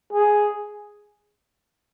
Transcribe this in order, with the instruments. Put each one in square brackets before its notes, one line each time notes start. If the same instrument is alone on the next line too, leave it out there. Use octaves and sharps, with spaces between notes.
[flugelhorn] G#4